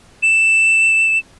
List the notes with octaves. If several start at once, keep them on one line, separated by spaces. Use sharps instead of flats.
E7